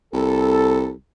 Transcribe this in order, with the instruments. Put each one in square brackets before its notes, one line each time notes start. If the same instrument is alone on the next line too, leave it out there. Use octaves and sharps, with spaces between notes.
[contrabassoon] C2 [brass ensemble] A4